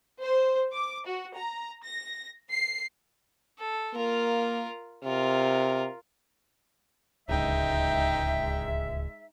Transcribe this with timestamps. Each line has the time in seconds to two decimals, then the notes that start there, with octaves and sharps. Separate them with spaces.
0.21 C5
0.74 D6
1.05 F#4
1.36 A#5
1.83 A#6
2.53 C7
3.59 A4
3.94 A#3 F4 A#4
5.04 C3 F4 A#4
7.29 D1 C#2 G#3 D#4 E5 G5